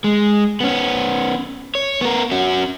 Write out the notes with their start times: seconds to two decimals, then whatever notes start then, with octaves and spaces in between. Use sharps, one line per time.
0.04 G#3
0.61 B3 C#4
1.75 C#5
2.01 B3 A#4
2.31 C#4 F#4